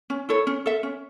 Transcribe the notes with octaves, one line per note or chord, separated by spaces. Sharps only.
C#4
E4 A4 C#5
C#4
A4 E5
C#4